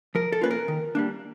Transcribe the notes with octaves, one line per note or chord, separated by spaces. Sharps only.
F3 A#4
A4
A#3 C#4 F4 B4
A#4
D#3
G3 A#3 D4